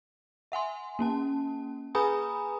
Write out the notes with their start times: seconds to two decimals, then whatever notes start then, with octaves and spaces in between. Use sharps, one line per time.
0.52 E5 F#5 G#5 C6
0.99 A#3 C#4 A5
1.95 G#4 B4 G#5 A#5 B5 D#6